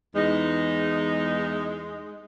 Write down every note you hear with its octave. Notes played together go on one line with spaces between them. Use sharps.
E2 G#3 D#4